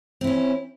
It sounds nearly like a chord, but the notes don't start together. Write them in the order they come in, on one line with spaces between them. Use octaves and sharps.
C4 E4 C#4